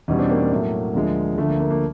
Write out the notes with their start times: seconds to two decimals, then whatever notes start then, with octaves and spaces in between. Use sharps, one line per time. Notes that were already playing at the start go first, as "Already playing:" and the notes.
0.08 E2 B2 G3 C#4 D#4
0.19 C4 D4
0.30 A#3 C4
0.41 A#3
0.51 A2 F#3 A3
0.95 D2 D3 F3 G#3
1.38 D2 D3 F3 A3
1.49 A#3
1.60 A#3
1.70 A#3